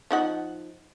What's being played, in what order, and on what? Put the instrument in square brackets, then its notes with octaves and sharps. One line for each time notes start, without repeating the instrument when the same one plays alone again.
[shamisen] F3 D#4 F#5